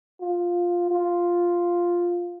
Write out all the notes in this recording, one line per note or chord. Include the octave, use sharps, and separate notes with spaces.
F4
F4